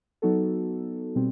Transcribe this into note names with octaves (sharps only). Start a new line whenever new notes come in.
F#3 B3 D#4 F#4 A4
B2 G3 C4